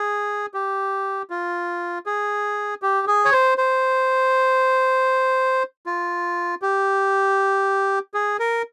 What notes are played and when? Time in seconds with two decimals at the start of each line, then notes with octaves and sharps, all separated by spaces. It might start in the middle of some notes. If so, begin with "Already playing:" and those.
Already playing: G#4
0.54 G4
1.30 F4
2.06 G#4
2.82 G4
3.07 G#4
3.25 C#5
3.32 C5
3.58 C5
5.86 F4
6.62 G4
8.14 G#4
8.39 A#4